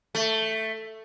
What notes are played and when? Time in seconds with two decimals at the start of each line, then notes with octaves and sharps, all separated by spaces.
0.15 A3